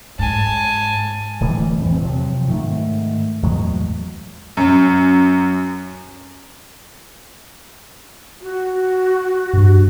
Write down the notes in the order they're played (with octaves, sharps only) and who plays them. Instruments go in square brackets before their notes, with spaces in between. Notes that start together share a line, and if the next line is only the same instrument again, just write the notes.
[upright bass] G#2 [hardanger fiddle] G#5 A5
[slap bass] D1 A2 E3 G3
E2 E3 C4
C3 F3 F#3
G#2 D#3 A3
E2 A2 F#3 G#3
[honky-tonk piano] F#2
[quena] F#4
[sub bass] G2